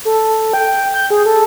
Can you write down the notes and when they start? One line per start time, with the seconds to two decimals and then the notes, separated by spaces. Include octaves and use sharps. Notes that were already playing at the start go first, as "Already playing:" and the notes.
0.05 A4
0.53 G5
0.94 G6
1.10 G#4
1.26 A4